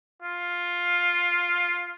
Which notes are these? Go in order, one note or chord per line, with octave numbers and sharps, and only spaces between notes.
F4